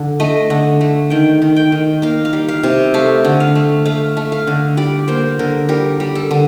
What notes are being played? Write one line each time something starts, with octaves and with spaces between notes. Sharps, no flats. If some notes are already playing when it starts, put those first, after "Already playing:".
Already playing: D3
A3 D#5
D3
A3
D#3 G5
D#3
G5
D#3
A#3 F5
F5
G3
F5
C3
A3 F5
D3
F5
A3
A3 F5
A3
F5
D3
G3 D5
A#3 C5
D3 A#4
G3 A#4
G3
A4
D3